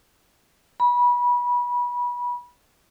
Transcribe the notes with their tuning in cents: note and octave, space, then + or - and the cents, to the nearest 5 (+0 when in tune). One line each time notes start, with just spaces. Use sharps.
B5 -25